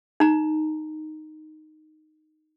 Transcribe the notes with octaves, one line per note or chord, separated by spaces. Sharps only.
D#4 A#5